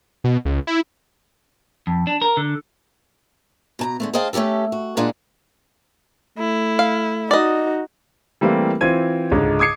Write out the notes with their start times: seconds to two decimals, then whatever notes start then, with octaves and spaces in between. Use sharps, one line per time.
0.24 B2
0.45 C#2
0.67 E4
1.87 F2
2.07 D4
2.22 A#4
2.37 D3
3.79 B2 A5 A#5
4.00 D3 G#3 A3
4.14 G#4 C5 D#5 F5 G5 A5
4.33 A3 C#4 D#4 G4 A4
4.72 F#4
4.97 A#2 G#3 D4 F4 G#4 F#5
6.38 A3 E4
6.79 F5
7.31 D#4 F#4 D5 D#5
8.41 E3 G3 A3 A#3 C4 E4
8.81 E3 C4 F4 C5 G#6 D#7
9.32 C#2 G#2 D3
9.59 D6 D#6 G#6 C7 C#7